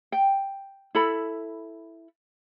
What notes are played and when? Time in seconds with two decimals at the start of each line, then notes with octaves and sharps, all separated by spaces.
0.12 G5
0.95 E4 A4 B5